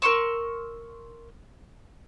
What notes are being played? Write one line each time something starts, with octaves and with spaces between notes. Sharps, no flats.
A#4 C6 C#6 E6